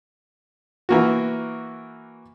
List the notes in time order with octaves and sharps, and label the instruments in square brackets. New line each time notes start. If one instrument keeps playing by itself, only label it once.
[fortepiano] E3 A#3 F#4